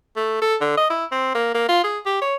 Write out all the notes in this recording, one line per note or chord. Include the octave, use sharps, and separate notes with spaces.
A3
A4
D3
D#5
E4
C4
A#3
A#3
F4
G#4
G4
C#5